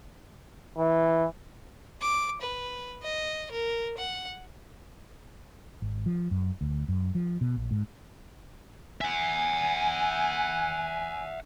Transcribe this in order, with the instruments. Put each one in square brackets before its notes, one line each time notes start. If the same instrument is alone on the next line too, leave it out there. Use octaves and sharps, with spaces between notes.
[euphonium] E3
[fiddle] D6
B4
D#5
A#4
F#5
[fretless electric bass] G#1
F3
F#2
D2
F#2
F3
B2
A#1
G#2
[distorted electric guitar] E5 F#5 [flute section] G#5